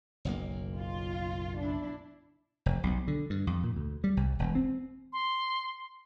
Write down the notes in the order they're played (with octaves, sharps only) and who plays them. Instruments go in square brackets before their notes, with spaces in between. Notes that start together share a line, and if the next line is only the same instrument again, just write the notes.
[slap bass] F#1 B1 A#3
[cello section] F4
D4 E4
[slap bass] F1
B1
D3
G2
F2
A#2
D2
G3
C2
E1
C4
[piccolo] C6